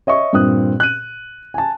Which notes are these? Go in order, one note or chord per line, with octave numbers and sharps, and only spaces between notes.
C#5 D#5 E5 C#6
G2 A#2 C4 D#6 F#6
F#6 D#7
G#5 A5